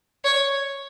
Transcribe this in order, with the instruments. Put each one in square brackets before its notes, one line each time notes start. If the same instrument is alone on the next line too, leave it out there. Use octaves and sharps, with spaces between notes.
[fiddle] C#5